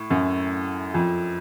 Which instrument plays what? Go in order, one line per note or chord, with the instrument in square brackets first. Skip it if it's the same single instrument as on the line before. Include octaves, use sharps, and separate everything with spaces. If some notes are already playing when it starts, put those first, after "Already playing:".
Already playing: [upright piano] A2
F#2
F2